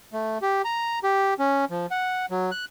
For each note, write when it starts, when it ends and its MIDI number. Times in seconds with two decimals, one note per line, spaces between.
0.13 0.38 57
0.42 0.62 67
0.65 0.99 82
1.03 1.34 67
1.39 1.65 61
1.70 1.86 53
1.91 2.26 78
2.31 2.51 54
2.51 2.65 90